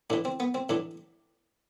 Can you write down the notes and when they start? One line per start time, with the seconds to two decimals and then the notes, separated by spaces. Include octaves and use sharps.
0.10 A2 E3 D4
0.25 C4
0.40 B3
0.55 C4
0.69 A2 E3 D4